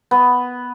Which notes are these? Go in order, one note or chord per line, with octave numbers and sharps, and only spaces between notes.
B3